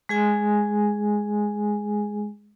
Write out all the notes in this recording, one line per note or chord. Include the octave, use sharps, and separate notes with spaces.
G#3 G#4 G#5